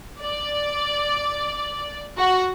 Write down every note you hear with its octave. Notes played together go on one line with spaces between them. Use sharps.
D5
F#4